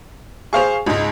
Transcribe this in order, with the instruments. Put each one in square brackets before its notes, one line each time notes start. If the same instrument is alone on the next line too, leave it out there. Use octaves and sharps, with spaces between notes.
[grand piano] G#4 F7 [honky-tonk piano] C5 F5 C#6
[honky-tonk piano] C#2 G#2 [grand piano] D#4